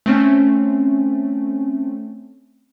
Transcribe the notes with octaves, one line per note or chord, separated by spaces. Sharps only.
A3 C4 C#4